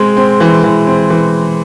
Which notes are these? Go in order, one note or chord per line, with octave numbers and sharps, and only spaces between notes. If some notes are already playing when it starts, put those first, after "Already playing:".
Already playing: G#3 C4
C4
E3
E3
C4
E3